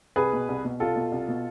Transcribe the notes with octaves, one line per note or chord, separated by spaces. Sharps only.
C2 G#4 B4
B2
C2
B2
C2 F4 A4
B2
C2
B2